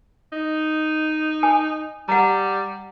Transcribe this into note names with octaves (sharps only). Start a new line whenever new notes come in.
D#4
G#5
G3 F#5 A#5